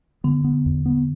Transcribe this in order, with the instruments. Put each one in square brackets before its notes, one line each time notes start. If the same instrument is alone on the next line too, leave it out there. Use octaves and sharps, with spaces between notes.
[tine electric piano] D3 [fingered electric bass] B3
[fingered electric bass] B3
E2
B3